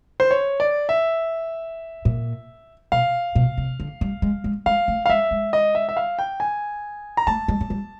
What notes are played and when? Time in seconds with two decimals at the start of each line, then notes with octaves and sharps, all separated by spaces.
0.20 C5
0.31 C#5
0.60 D5
0.89 E5
2.05 A#2
2.92 B2 F5
3.35 B2
3.57 C3
3.80 D3
4.01 G3
4.22 G#3
4.44 G#3
4.66 G#3 F5
4.88 A3
5.06 F5
5.09 G#3 E5
5.31 G#3
5.53 D#5
5.75 E5
5.89 E5
5.97 F5
6.19 G5
6.40 G#5
7.17 A#5
7.27 A3 A5
7.48 G#3
7.61 G#3
7.70 G3